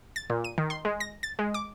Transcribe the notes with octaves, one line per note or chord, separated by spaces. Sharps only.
A6
A#2
D#7
D#3
C6
G#3
A#6
A6
G#3
D6